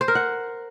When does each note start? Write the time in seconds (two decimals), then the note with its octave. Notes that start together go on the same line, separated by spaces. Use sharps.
0.01 C5
0.08 A#4
0.15 F#5